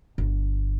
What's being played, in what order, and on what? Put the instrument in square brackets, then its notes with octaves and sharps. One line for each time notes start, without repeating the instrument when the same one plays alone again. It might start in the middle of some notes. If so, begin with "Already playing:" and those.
[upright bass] G1